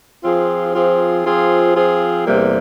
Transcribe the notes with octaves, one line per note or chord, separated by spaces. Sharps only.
F3 C4 F4 G#4
F3 C4 F4 G#4
F3 C4 F4 G#4
F3 C4 F4 G#4
E2 C3 G3 A#3